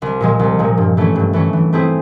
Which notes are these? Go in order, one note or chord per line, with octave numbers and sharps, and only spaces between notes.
C2
A#2 F3 G#3
C2
A#2 F3 G#3
G2
E3 A3 C#4
G2
E3 A3 C#4
E3
A3 C4 E4 G#4